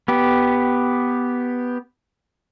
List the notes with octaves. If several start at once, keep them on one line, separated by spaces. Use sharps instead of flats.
B3 G4